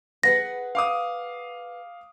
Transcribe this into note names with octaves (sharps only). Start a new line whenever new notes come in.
G#4 B4 F#5 A#6
F5 D6 D#6